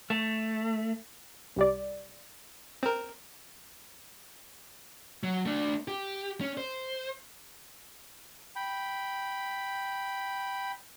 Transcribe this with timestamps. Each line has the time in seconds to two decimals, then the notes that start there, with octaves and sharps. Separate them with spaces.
0.10 A3
1.56 C2 G3 D5
2.83 C4 A#4
5.23 F#3
5.46 A3 D4
5.88 G4
6.41 C#4
6.57 C5
8.56 G5 B5